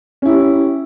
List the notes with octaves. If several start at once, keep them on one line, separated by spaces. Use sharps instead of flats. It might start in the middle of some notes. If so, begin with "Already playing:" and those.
C#4 E4 G4